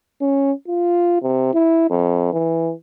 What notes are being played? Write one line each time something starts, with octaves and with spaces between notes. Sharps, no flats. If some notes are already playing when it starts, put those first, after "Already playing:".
C#4
F4
C3
E4
F2
E3